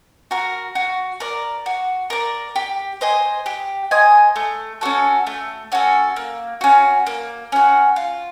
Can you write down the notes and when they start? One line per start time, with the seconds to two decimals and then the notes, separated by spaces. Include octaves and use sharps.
0.31 F#4 A#4
0.75 F#4
1.20 A#4 D5
1.66 F#4
2.10 A#4 D5
2.56 G4
3.01 C5 D#5 G#5
3.46 G4
3.91 C5 D#5 G#5
4.36 A3
4.81 C#4 F#4 A4
5.27 A3
5.72 C#4 F#4 A4
6.16 A#3
6.61 C#4 F#4
7.07 A#3
7.52 C#4 F#4
7.96 F4